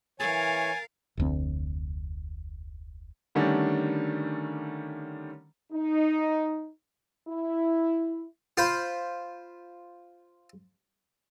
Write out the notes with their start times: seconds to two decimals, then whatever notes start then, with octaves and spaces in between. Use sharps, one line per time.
0.20 E3 A#4 C#5 F5 G#5 A6
1.17 F1 D2 C4
3.35 D3 D#3 G3 A3 C#4 D4
5.72 D#4
7.28 E4
8.57 F4 C5 B5